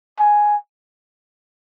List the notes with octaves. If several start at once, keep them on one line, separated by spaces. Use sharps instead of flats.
G#5